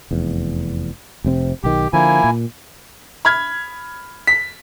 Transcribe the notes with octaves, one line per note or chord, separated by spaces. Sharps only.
F1 E2
F1 C3 C4
B1 D#3 G4
D3 F3 A#3 E4 G#5
A#2
B5 F6 G#6
B6